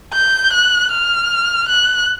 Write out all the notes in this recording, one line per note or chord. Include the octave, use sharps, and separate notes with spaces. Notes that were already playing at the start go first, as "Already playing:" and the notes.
G6
F#6
F6
F#6